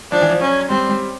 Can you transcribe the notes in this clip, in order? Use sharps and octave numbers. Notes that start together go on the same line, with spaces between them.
F3 D4
E3
F3
F#3 C#4
G3 C4
G3